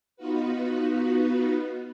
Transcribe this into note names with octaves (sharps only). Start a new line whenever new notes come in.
B3 D#4 F4 F#4 B4